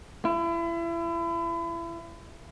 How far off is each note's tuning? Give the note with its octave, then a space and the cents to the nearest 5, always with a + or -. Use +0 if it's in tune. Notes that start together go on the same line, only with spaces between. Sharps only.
E4 +35